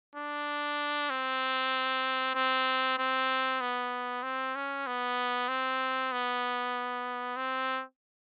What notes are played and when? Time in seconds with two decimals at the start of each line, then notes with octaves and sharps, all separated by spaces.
0.15 D4
1.10 C4
2.35 C4
2.98 C4
3.61 B3
4.23 C4
4.55 C#4
4.87 B3
5.48 C4
6.12 B3
7.37 C4